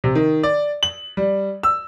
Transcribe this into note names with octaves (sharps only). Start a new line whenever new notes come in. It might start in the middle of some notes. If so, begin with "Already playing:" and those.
C3
D#3
D5
F#7
G3
E6